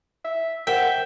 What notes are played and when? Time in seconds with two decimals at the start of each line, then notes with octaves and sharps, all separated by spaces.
0.25 E5
0.67 A#4 C5 E5 F#5 G5